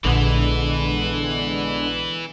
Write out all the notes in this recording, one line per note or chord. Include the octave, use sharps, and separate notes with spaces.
A#1 D3 E3 G#3 B3